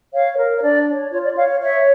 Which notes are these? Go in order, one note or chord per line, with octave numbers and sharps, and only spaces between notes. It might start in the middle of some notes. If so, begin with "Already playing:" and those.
C#5 F5
A#4
C#5
D4 D5
C#5
F4 C#5
D5
C#5 F5
C#5 E5